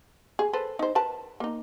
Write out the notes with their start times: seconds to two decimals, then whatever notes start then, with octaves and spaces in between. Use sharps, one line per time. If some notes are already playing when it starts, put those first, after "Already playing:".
0.39 G#4
0.53 A4 B4 C5
0.79 D#4 C5
0.95 A#4 B4 A5
1.40 A#3 D#4